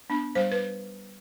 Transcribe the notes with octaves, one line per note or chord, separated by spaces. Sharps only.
B3 D4
G3 C5
B4